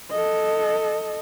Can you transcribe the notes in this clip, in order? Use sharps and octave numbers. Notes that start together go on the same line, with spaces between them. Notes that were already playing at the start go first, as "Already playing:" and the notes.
A4 D#5